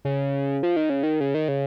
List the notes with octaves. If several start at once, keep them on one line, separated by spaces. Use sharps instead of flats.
C#3
F3
D#3
C#3
D#3
C#3
D#3
C#3